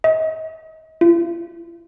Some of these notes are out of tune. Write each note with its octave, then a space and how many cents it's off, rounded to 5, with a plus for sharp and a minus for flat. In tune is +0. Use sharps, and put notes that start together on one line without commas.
D#5 +35
E4 +45